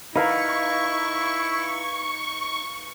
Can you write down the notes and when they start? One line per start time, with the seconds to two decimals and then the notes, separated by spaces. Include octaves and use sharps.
0.16 D#4 E4 B4 F5 A#5 C#6